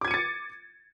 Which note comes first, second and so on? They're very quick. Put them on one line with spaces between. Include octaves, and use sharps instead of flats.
D6 G#6 D#7 C#7 A6